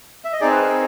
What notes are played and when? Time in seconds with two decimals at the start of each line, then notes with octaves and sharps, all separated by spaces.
0.25 E5
0.33 D#5
0.41 C4 D#4 G#4 D5
0.52 B4
0.62 A#4